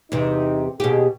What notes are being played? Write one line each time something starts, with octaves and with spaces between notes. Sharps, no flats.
E2 C3 D#4
D#2 B2 G4 G#4